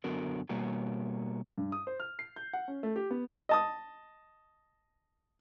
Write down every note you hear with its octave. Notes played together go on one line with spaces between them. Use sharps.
F#2 D3 B3 F#4 A#4
B2 G3 A#3 F#4
G2
D#6
C5
F6
C7
G6
F#5
C#4
A3
G4
B3
D#5 A5 D#6